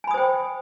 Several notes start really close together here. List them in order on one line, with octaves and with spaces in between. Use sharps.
G#5 B5 D#6 C5 G5